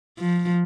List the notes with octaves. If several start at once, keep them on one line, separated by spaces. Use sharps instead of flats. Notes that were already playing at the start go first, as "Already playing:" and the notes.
F3